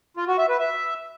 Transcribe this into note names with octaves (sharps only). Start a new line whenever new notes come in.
F4
F#4
E5
B4
E5